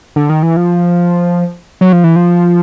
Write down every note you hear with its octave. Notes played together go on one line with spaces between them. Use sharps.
D3
D#3
E3
F3
F#3
F3
E3
F3